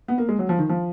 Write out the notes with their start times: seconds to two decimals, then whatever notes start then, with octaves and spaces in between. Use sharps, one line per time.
0.08 B3
0.18 A#3
0.29 G#3
0.39 F#3
0.49 F3
0.59 D#3
0.69 F3